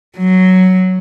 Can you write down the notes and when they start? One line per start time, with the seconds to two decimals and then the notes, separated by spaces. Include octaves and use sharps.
0.17 F#3